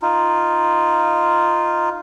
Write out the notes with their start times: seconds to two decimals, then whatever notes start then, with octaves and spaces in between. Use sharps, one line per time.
0.02 D#4 F4